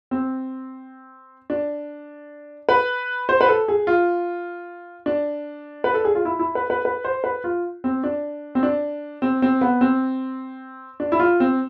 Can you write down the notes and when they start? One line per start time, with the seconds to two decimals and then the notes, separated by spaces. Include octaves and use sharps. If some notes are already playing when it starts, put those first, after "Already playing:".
0.11 C4
1.50 D4
2.69 B4
3.29 C5
3.41 B4
3.49 A4
3.68 G#4
3.87 F4
5.06 D4
5.84 B4
5.94 A4
6.05 G#4
6.15 F4
6.25 E4
6.39 E4
6.55 B4
6.70 B4
6.85 B4
7.05 C5
7.24 B4
7.44 F4
7.84 C4
8.04 D4
8.55 C4
8.63 D4
9.22 C4
9.42 C4
9.61 B3
9.81 C4
11.00 D4
11.12 E4
11.20 F4
11.40 C4